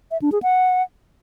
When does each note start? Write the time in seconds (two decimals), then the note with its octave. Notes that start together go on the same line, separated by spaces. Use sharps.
0.11 E5
0.22 D4
0.32 G#4
0.43 F#5